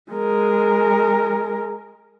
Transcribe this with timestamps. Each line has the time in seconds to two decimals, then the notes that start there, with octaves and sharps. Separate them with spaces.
0.11 G#3 A#4